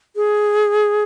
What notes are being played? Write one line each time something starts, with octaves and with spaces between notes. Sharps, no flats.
G#4